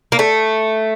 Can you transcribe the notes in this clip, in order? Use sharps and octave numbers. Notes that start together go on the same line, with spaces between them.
A#3
A3